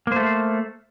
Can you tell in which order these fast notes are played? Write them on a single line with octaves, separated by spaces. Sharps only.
A#3 C5 A3